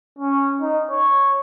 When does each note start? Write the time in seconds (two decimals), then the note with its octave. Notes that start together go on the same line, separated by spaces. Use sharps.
0.19 C#4
0.62 D#4
0.91 C#5